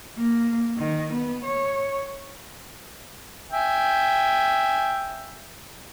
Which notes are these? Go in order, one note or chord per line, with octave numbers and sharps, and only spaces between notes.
A#3
D#3
B3
C#5
E5 G5 G#5